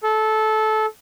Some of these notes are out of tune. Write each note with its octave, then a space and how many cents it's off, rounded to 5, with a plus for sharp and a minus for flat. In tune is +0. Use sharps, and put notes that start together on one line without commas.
A4 -20